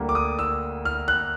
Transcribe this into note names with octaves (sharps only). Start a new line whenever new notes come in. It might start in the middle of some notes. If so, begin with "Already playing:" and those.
Already playing: D2 D3 G3 A#3
D6
D#6
E6
F6
F#6